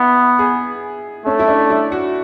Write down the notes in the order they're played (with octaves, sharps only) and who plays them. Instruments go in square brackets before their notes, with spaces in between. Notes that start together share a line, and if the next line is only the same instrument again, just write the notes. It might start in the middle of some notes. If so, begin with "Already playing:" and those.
Already playing: [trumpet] B3 [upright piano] E4
[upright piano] G#4
[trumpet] A3 [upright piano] C#4
[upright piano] E4
D4
E4
F#4